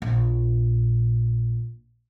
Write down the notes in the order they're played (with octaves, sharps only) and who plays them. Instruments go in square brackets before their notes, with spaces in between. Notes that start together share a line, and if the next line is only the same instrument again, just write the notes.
[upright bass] A#1 A#2